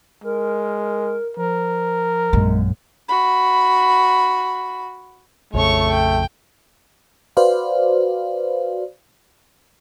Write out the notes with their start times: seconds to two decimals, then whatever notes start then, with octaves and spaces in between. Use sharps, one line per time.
0.24 G#3 A#4
1.37 F3 A#4
2.33 A#1 F#2 G#3
3.08 F#4 B5
5.54 A#1 F2 C#3 A3 C#5 C#6
5.89 G5
7.37 F#4 B4 C5 D5 F5